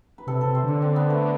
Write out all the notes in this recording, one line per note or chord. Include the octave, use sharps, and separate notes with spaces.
B4
C3 A4
C3 A4
C5
D3 D4
C4
B3
A3